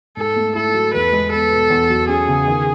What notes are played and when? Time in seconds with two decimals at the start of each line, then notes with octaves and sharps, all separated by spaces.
0.17 G#2 A4
0.36 A3
0.55 E4 A4
0.74 F#3
0.94 E2 B4
1.13 G#3
1.32 B3 A4
1.52 B2
1.70 E2
1.90 F#3
2.09 C#4 G#4
2.28 C#3
2.47 D#3